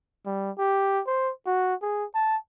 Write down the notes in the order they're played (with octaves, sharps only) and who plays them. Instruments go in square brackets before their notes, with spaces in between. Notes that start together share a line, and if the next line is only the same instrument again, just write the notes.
[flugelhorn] G3
G4
C5
F#4
G#4
A5